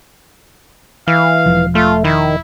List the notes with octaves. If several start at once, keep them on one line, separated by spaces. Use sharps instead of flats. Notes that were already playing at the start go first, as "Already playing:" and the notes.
E3 F5
E1 F3
A3 F4
D#3 E4